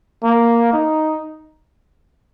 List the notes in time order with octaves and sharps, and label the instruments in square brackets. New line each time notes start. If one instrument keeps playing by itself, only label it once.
[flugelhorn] A#3
D#4